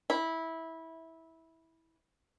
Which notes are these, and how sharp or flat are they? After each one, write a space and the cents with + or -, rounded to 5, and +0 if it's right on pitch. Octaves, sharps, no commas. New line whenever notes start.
E4 -15